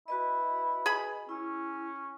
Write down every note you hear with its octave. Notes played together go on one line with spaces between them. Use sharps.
E4 F#4 B4 D#5
G#4 B5
C#4 E4